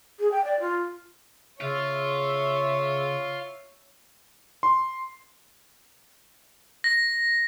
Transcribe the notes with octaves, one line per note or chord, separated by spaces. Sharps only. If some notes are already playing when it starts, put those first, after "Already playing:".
G#4
G5
D5
F4
C#3 F4 C#5 E5
C6
A#6